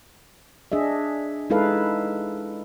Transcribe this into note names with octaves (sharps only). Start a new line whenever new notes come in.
D4 G#4 D#5 E5
G#3 D#4 E4 A4 B4 F5